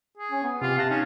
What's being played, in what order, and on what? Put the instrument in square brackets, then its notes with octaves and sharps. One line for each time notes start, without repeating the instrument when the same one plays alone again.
[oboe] G#4
[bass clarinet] C#4
B3
[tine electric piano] C3 G4 C6 [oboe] F4
[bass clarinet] C3 [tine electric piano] F5 F#6 A#6 [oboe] A5
[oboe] C#4 [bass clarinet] D#4